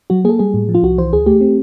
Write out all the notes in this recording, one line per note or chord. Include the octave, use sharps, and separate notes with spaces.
F#3 F#4
A#3 G#4 A4
G3 G#4
A2
F3
F4
C2 F#4
E3 C5
D2 G#4
A3 G4
C4